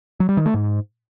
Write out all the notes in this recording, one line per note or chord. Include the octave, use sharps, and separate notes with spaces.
F#3
G3
D#3
A3
G#2